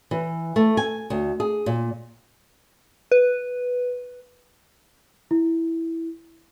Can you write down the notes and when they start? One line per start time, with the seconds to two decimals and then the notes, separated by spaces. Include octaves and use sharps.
0.11 E3
0.56 A3
0.77 G#5
1.10 D2
1.40 G#4
1.66 A#2
3.12 B4
5.31 E4